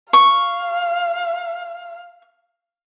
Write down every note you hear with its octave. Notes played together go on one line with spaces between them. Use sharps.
F5 C#6